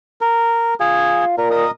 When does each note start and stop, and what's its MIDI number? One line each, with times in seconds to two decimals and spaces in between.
0.21 0.74 70
0.80 1.35 65
0.80 1.25 68
0.80 1.25 80
1.38 1.64 46
1.38 1.49 70
1.51 1.71 70
1.51 1.71 75
1.51 1.71 87